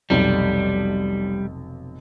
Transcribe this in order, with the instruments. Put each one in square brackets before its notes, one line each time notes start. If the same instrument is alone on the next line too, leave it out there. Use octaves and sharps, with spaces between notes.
[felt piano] F1 B1 [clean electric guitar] G3